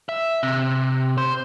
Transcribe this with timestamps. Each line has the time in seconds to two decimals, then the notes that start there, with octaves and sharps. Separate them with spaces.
0.09 E5
0.43 C3
1.18 C5